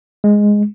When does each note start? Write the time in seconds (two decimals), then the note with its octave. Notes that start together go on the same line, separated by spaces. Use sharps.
0.24 G#3